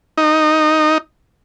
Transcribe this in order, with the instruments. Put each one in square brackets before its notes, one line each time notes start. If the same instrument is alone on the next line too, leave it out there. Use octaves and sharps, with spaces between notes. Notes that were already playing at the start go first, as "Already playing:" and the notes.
[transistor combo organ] D#4